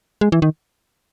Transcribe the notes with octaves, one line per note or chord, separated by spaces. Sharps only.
G#3
E3
D#3